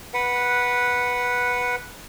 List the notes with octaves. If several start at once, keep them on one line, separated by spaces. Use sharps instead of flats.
B4 F#5